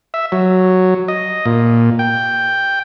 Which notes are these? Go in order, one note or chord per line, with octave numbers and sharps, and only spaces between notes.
E5
F#3
D#5
A#2
G5